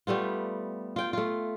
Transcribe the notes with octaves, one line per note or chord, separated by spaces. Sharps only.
G3 A3 B3 F4
F4 G5
A3 F4